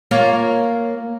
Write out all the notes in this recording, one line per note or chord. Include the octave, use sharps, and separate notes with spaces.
A#3 F4 C#5